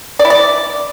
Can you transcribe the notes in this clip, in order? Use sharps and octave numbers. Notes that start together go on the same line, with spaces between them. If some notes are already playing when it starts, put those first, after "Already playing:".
D5
E4
D5